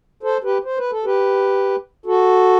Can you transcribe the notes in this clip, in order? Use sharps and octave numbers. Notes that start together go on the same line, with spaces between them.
A4 C5
G4 B4
C5
B4
A4
G4 B4
F#4 A4